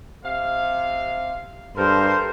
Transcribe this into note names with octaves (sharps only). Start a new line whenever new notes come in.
C3 F5
G2 A4 A#4 C5